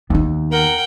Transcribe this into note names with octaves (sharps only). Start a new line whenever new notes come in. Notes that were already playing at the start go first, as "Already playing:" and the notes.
D#2 B3 D#4
A#4 F#5 G5